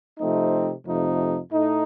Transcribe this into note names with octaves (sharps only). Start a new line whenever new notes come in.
C3 F3 A3 C4 D#4
F2 C3 F3 A3 D#4
A2 A3 D#4